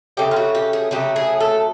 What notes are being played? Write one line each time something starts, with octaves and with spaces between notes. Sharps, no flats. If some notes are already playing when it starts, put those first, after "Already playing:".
C#3 F#3 A3 G4
F4
F#4
G4
G#4
C#3 F#3 A3 G4
G#4
A4